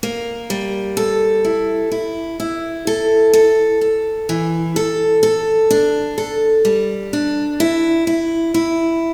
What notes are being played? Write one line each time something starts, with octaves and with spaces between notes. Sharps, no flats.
A#3
G3
A4
E4
E4
E4
A4
A4
A4
E3
A4
A4
D4
A4
G3
D4
E4
E4
E4